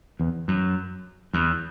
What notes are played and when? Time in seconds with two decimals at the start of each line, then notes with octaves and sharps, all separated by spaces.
0.20 E2
0.48 F#2
1.33 E2